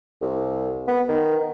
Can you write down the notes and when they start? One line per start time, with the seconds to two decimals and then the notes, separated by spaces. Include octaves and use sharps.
0.22 C2
0.88 B3
1.09 D#3